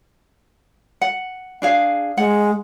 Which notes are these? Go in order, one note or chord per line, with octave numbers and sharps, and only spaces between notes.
F#5
D4 G#4 F5
G#3 F#5